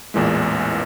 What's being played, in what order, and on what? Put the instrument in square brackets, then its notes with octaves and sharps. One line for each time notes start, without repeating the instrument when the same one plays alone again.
[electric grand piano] A1 E2 A#2 E3 G#3